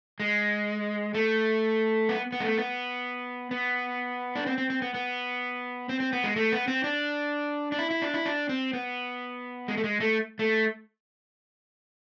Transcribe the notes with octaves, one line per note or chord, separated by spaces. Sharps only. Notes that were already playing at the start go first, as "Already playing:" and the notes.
G#3
A3
B3
B3
G#3
A3
B3
B3
D4
C4
C4
C4
B3
B3
C4
C4
B3
G#3
A3
B3
C4
D4
D4
E4
E4
D4
E4
D4
C4
B3
G#3
A3
G#3
A3
A3